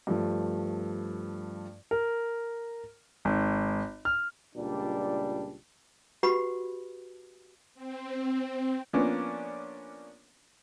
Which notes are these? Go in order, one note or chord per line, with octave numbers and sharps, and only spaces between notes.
G2 F3 A3
A#4
G#1
F6
C#2 A#2 G3 D4
F#4 G4 B4 F#5 B5
C4
F3 A#3 B3 C#4 D4